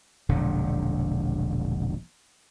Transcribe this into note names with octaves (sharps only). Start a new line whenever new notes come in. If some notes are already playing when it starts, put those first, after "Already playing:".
E1 A#1 D3